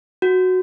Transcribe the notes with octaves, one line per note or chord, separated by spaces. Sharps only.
F#4